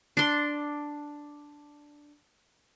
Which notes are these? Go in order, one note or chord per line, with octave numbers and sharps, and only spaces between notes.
D4 C6